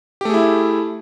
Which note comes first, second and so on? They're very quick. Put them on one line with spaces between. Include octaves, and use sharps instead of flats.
G4 A3 G#4 E4